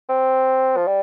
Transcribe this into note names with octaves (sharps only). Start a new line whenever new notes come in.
C4
F3
G3